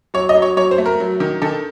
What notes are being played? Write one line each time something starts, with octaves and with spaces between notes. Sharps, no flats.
F#3 C#5
D#5
F#3
C#5
F#3 C#5
C5
A3
A#4
F#3
D#3
D#3 A4